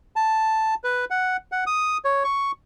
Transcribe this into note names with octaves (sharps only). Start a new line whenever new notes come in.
A5
B4
F#5
F#5
D#6
C#5
C#6